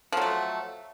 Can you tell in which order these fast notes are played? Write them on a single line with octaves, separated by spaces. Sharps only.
F3 F#3 A3